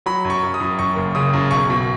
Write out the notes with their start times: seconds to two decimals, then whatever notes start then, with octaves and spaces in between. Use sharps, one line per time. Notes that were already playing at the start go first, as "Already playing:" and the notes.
0.06 F#3 B5
0.25 F#2
0.30 C#6
0.43 F#2
0.54 D#6
0.60 F#2
0.79 F#2 C#6
0.96 F#1
1.15 C#3 D#6
1.33 F#2
1.51 B1 C#6
1.70 B2